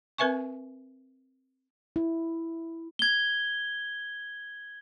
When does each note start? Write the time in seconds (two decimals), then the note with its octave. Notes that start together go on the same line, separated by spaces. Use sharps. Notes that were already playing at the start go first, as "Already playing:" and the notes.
0.18 C4 A#4 B4 E5 G#5 C#6
1.96 E4
2.99 G#6 G7